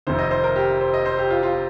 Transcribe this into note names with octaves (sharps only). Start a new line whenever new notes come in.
F1 F2 C3 D#3 C5
D#5
C5
A#4
G4
C5
D#5
C5
G4
F4
F4